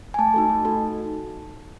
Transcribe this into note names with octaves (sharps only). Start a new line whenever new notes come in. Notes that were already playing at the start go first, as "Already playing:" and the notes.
G#5
A3 A5
D#4 F#4 A4
A3
D#4 F#4 A4